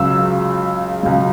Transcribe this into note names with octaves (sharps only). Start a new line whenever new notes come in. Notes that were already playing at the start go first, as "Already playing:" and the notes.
Already playing: C#2 C#3 F#3 E6
C#2 C#3 F#3